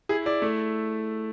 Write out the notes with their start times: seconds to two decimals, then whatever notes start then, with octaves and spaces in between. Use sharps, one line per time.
0.09 E4 G#4
0.26 E4 D5
0.42 A3